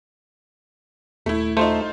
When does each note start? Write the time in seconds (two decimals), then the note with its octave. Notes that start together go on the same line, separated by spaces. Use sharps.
1.26 D#1 A3 E4
1.57 A3 D#4 F4 C5